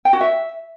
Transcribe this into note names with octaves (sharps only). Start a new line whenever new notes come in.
G5
F#4
E5